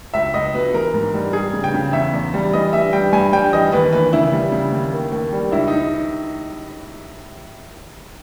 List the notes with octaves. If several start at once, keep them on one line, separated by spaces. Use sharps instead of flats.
C#2 E5
C#2 D#5
B2 B4
E3 A#4
G#2
G3
G3 G#4
C#3
G5
C#3
E2 E5
E2
G3
E3 D#5
G3 E5
G3 G5
G2 G#5
G3 G5
E3 D#5
D#2 B4
E3 B4
C#3 E4
G3
C#3
D#2
D#3
D#2
G3
C#2 E4
D#4